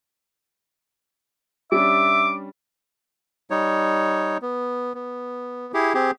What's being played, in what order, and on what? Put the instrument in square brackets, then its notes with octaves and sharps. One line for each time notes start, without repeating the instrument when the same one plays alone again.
[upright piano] G3 C#4 D4 [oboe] E5 [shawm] D6
[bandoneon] G3 D#4 C#5
B3
B3
E4 G4 G#4
C4 G4 G#4